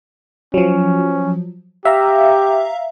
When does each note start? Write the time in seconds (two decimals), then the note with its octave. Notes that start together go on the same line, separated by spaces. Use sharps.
0.54 F3 F#3 C#4
1.85 G4 E5 F5 A#5